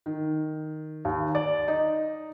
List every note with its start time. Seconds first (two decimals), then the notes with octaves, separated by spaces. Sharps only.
0.06 D#3
1.05 D#2
1.35 D5
1.68 D#4